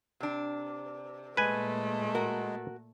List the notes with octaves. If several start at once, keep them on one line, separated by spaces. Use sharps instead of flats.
C3 D4
A#2 G#3 A3 B4 G#5
F#4 A#4